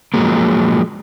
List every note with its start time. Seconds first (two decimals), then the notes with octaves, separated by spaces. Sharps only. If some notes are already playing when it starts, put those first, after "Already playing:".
0.14 F3 F#3 G#3 A#3